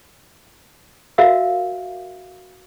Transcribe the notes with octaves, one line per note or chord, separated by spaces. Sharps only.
F#4 A#4 E5 F5